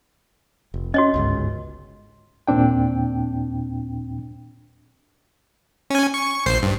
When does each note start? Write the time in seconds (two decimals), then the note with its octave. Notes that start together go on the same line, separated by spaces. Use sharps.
0.74 F1
0.94 C#4 F#4 C#5 D#5
1.14 G1 C#2 G#2
2.48 D#2 A#2 C4 D4 G5
5.90 C#4 G#5
6.14 C#6
6.46 A#1 C5 C7
6.62 G2